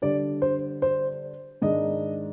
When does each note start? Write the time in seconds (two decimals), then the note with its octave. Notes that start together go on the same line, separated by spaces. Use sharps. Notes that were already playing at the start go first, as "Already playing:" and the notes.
0.02 D3 G3 D4 D5
0.42 C5
0.82 C5
1.62 G#2 D#3 G#3 D4 D#5